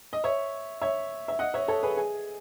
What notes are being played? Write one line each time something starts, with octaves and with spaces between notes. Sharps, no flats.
D#5
C#5 E5
C#5 E5
E5
D#5 F#5
C#5 E5
A4 C#5
G#4 B4
G#4